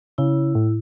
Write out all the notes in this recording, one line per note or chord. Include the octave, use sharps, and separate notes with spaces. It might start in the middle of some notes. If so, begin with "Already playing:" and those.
C#3 E4
A2